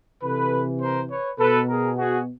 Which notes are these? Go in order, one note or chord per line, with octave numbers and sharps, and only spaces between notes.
C3 E3 A4 B4
A#4 C5
B4 C#5
B2 A4 B4
G#4 A#4
F#4 G#4